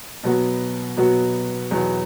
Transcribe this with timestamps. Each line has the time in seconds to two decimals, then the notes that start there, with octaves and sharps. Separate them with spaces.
0.23 B2 F#3 B3 F#4
0.97 B2 F#3 B3 F#4
1.71 E2 B2 F#3 B3